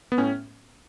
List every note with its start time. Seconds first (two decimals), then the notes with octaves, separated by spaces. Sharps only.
0.12 B3
0.18 A2 C#4